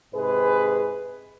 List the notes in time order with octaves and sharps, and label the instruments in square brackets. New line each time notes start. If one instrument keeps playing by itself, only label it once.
[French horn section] G#2 C3 G#4 B4